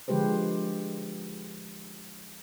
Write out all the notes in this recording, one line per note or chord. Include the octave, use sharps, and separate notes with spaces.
D3 F3 G#3 G4 B4 C5